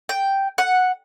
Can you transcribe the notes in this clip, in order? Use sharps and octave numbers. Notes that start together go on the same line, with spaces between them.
G5
F#5